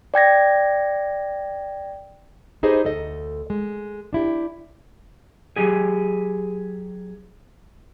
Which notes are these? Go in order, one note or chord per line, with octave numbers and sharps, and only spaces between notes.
D5 G5 G#6 A#6
D#4 G4 G#4 B4 C5 D#5
D2 A4 D#5
G#3
D4 E4 G4
F#3 G4 G#4